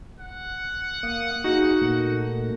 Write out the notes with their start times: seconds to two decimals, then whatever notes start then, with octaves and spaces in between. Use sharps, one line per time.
0.20 F#5
1.03 A#3 F5 D#6
1.44 D#4 F#4 G#4
1.81 A#2 A3 A#3